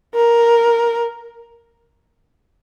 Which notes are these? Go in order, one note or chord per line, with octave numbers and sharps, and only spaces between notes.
A#4